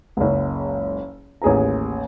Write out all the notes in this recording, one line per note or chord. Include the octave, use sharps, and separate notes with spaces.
F#1 C#2
A1 D#2 G#4 B4 A#5